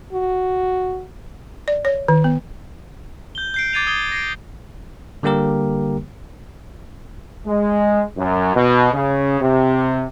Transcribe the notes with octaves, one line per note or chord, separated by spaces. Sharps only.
F#4
D5
C#5
D#3
B3
G6 G7
G6 C7 D7
D6 G#6 A6 C7 D#7 F7
D#6 G#6 G7
A#6 C7 D7
D3 G3 A#3 G4 A#4
G#3
F#2
B2
C#3
C3